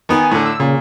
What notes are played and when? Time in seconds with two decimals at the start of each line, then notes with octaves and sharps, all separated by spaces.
0.09 D#3 B3 G#5
0.31 A2 D3 G#5
0.46 E6
0.60 A#2 C#3